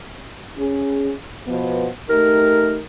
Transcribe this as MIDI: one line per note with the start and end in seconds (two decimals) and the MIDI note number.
0.58 1.12 61
0.58 1.12 68
1.47 1.87 47
1.47 1.87 53
1.47 1.87 59
2.09 2.77 57
2.09 2.77 63
2.09 2.77 67
2.09 2.82 70